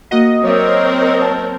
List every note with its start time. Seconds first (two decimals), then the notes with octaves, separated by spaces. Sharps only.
0.11 A#3 F#4 D#5 F#5
0.43 F#3 C4 A#4 C#5 D5 E5
1.22 A5